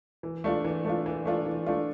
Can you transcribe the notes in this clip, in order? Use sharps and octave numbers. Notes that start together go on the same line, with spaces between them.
E3
A3 D4 F4
E3
A3 D4 F4
E3
A3 D4 F4
E3
A3 D4 F4